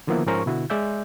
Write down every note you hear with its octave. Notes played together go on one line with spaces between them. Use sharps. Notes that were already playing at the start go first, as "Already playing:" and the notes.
D3 D#3 F3 A#3 B3 E4
G#2 F3 C#4 A#4 C5 C#6
B2 D3 E4 F#4
G#3 D5 E5 G6